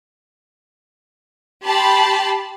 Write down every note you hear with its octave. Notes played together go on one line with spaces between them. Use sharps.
G4 A5 B5 C6